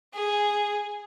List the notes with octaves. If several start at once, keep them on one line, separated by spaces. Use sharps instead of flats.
G#4